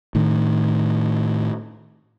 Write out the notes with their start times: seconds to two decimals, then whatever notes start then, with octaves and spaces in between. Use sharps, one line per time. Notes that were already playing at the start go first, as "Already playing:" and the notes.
0.15 A2 D#3